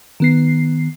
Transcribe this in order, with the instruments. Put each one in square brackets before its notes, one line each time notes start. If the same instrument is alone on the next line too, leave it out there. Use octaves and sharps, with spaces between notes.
[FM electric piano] D#3 B3 C7